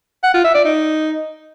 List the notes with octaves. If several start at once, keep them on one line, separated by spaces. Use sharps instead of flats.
F#5
F4
E5
D5
D#4